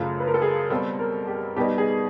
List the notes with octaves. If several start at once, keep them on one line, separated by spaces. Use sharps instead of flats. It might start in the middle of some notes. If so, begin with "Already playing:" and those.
Already playing: F#2 C#3 F3 A3
B4
A#4
A4
G#4
B2 G3 C4 A4
A#4
G4
B2 G3 B3 D#4 G4
G#4